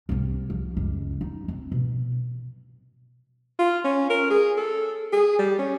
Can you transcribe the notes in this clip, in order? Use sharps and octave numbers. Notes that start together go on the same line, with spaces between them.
C2 C3
F3
F#1 C#2
D#4
C4
B2
F4
C#4
A#4
G#4
A4
G#4
G3
C#4